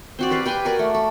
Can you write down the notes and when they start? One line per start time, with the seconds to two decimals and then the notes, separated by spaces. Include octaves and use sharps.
0.19 C4 F#4 D5
0.30 G4 B4 D5 F5
0.46 G4 B4 G5 G#5
0.65 F#4 A#4 D5
0.79 A3
0.94 A4